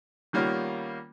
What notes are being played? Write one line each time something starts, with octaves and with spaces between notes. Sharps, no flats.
D#3 G3 A#3 B3 C#4 F4